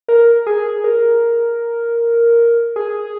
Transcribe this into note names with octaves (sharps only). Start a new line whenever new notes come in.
A#4
G#4
A#4
G#4